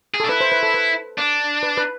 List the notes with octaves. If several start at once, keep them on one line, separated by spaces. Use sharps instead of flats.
G#4
D4 A4
E4 B4
C5
B4
A4
B4
D4
B4
B4